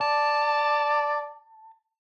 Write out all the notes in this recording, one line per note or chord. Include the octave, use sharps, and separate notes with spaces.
D5 A5